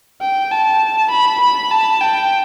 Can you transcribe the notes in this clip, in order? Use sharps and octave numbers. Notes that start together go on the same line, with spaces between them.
G5
A5
B5
B5
A5
G5